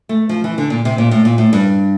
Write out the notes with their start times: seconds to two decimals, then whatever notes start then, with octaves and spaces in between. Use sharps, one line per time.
0.09 A3
0.29 F3
0.44 E3
0.58 D3
0.70 A#2
0.85 C3
0.98 A#2
1.11 A2
1.25 A#2
1.38 A2
1.53 G2